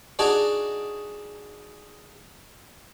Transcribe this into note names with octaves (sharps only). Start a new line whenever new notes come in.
D4 D#4 F#4 G#4 D5